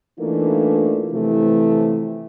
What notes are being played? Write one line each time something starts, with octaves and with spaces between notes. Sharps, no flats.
E3 A3 A#3 D4 D#4 F4
C3 E3 F3 A3 E4